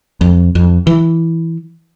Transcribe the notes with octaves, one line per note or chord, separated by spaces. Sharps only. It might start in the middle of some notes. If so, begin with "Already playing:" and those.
F2
F2
E3